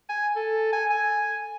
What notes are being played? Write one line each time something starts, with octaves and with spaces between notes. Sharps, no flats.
G#5
A4
G#5
G#5